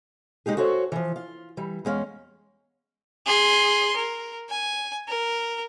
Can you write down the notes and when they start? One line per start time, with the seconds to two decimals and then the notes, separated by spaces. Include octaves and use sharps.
0.46 G#3 D#4 G4 G#4
0.57 F#4 A4 C5 C#5 E5
0.92 E3 F3
1.16 F4
1.57 E3 G3
1.85 E2 G#3 C#4 F5
3.26 G#4 C6
3.96 A#4
4.49 G#5
5.08 A#4